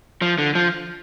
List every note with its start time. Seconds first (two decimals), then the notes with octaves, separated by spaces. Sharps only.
0.22 F3
0.38 D3
0.55 F3